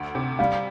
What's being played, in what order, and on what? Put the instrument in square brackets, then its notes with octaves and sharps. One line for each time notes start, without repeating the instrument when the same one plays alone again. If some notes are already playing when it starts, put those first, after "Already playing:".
Already playing: [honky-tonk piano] D2
C3
[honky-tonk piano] G3 [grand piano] F5